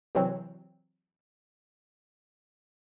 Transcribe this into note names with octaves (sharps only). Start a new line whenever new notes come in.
C3 E3 F#3 C4